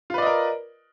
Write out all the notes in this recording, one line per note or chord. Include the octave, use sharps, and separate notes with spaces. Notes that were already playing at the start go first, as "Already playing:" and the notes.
F4 A#4 B4 D5 D#5